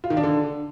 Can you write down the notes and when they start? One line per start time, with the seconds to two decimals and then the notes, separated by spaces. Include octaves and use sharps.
0.04 F4
0.10 D#3
0.17 D4
0.23 D3